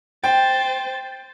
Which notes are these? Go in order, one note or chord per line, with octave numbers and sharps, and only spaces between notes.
C5 G5 A6